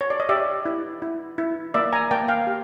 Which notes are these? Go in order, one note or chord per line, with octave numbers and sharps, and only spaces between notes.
C#5
D5
D#5
G4 D5 E5
E4
E4
E4
A#3 D5 E5
G#5 A#5
A#3 G5 A5
F5 G5
G4